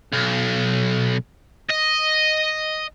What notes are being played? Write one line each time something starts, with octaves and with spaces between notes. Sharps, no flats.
B1
D#5